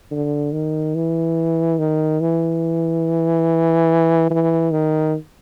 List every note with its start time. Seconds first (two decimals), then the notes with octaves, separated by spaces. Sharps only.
0.11 D3
0.52 D#3
0.95 E3
1.79 D#3
2.21 E3
4.30 E3
4.71 D#3